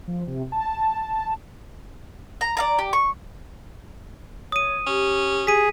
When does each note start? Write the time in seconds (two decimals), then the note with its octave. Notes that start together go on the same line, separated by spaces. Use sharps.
0.08 F3
0.27 C3
0.52 A5
2.41 A#5
2.57 D5 F5 A#5
2.78 G4
2.93 C#6
4.52 C#5 D#6 D#7
4.87 C#4 G4
5.47 G#4 B6 D#7